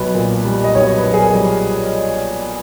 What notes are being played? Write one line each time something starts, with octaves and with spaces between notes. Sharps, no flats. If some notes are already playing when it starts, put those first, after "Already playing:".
Already playing: B1 B4
A#2
G3
D#5
B1 C#5
B4
B1
G#4
A#4
G3